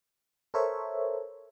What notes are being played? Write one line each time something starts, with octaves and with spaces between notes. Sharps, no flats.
A4 A#4 C5 C#5 E5